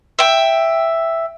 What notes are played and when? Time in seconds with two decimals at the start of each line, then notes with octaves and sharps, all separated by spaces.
0.19 E5 G5